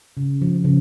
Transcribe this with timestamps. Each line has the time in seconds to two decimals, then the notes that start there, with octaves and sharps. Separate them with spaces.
0.17 C#3
0.42 F3
0.64 C#3